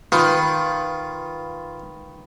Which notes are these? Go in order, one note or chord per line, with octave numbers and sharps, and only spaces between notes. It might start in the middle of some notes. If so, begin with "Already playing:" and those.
D#3 F4 B4